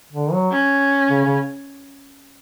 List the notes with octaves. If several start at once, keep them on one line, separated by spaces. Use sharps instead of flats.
D3
F#3
C#4
C#3
C#3